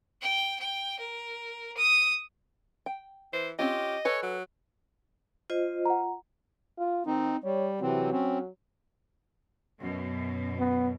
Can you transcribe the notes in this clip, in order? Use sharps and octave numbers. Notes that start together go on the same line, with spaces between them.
G5
G5
A#4
D#6
G5
E3 C5
C4 C#4 F4 G4 D#5
A4 B4 C#5 G#5
F#3
F4 C5 D#5
F#5 A#5
F4
D#3 C4 D#4
G3 C#5
C3 E3 F#3 C4
C4 C#4
F#2 B2
B3